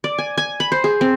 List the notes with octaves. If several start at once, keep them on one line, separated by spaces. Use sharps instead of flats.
D5
G#5
G#5
B5
C5
G#4
C4